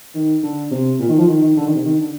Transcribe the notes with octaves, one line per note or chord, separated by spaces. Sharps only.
D#3
D3
C3
A#2
D#3
F3
D#3
D#3
D3
D#3
C3
D#3
D3